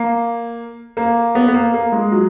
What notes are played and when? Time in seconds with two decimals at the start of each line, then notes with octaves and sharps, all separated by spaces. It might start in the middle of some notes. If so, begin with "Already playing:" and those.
Already playing: A#3
0.97 A#3
1.35 B3
1.48 B3
1.54 A#3
1.74 A#3
1.92 G#3
2.12 F#3